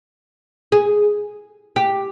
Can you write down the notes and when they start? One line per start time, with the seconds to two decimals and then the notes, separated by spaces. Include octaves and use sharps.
0.72 G#4
1.76 G4